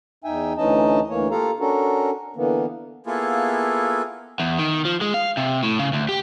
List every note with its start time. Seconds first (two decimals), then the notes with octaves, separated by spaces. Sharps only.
0.24 E2 D#4 E5 G5 G#5
0.57 D2 E3 C#4 D#4 D#5 A5
1.10 D2 E3 A#3 C#5
1.31 A#3 F4 G4 A4 F5 A#5
1.60 C#4 D4 F#4 A4 A#4
2.36 D3 E3 A#3 B3
3.06 A#3 B3 E4 F4 G#4 A4
4.40 E2
4.59 D#3
4.85 F3
5.01 G#3
5.14 F5
5.37 C3
5.63 A2
5.79 C#3
5.93 D2
6.09 G4